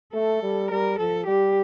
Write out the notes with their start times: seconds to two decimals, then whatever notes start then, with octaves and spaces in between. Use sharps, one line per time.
0.14 A3 A4
0.42 G3
0.71 G3 A#4
0.99 F3 A4
1.27 G3 G4